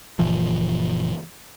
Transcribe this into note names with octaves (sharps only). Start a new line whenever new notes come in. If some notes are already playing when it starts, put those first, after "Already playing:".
F#1 A#2 E3 F3